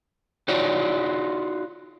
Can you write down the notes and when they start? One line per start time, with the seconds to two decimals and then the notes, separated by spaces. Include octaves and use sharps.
0.48 D#4 F4 F#4 C#5 D5